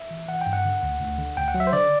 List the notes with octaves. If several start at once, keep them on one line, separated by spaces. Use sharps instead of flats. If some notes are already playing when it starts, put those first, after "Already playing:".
Already playing: E5
E3
E3 F#5
G5
G2
F#5
D3
D2
D2
D3
D2 G5
F#5
F#3
E5
C5
D3 D5